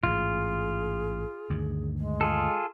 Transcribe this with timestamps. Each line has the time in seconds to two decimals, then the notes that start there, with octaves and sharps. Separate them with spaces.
0.04 A1 G#2 F4 G#4
1.50 D2 G2 D#3
1.98 G#3
2.21 F4 G#4 A4